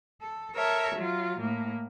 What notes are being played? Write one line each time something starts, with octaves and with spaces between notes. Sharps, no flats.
A4
A4 A#4 C#5 E5
F#3 F4
A2 A#3